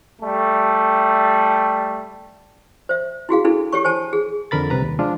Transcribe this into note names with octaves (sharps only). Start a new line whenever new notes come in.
G3 A3
C5 E5
E4 F#4 G#4 F5
D4 E4 A4
G4 A4 C#5 C#6
C5 G#5 A5
G#4
F2 D3 A#4 B5 A6
C2 C3 B4 A#5
D#2
F3 G#3 D4 F4